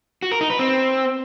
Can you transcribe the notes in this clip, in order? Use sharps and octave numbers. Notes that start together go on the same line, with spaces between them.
F#4
A#4
D#4
B4
C4